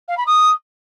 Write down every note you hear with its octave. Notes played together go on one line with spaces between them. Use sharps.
F5
B5
D#6